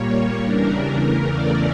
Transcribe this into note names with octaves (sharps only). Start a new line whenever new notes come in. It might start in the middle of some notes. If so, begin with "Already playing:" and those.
Already playing: A#2 G3 A#3 C#5
C#5
E2 C#3 E3 G3 D4 A#4
E2 C#3 E3 A3 A#4
D5